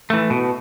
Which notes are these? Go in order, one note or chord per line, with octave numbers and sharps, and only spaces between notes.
E3 A3
B2